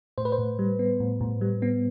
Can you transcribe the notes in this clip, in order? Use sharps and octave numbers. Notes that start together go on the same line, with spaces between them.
A2 C5
B4
C5
A2
G3
B3
A2
A2
G3
B3